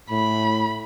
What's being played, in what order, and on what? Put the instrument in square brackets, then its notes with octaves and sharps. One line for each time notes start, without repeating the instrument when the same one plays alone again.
[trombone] A2 [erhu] B5